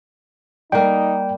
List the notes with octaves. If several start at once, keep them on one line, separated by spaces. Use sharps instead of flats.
G3 A#3 D#4 G5